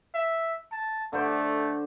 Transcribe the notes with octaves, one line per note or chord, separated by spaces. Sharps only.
E5
A5
D3 A3 C5 D6